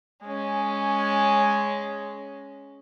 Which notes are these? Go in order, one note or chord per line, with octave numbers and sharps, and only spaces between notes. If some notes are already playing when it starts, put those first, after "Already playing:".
G#3 C#4